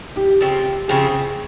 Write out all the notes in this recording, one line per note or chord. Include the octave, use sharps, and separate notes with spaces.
G4
C#3 F3 C4
C#3 F3 C4 G#4